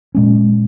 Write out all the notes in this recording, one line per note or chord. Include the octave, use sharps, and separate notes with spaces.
A#2 G#3 C#4